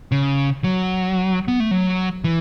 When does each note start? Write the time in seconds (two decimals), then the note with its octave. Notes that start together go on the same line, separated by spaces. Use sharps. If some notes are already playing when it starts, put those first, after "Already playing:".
0.12 C#3
0.64 F#3
1.48 B3
1.60 A3
1.71 F#3
2.24 E3